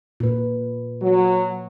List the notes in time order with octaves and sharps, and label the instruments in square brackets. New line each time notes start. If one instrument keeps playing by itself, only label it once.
[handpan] A#2 B4
[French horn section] F#3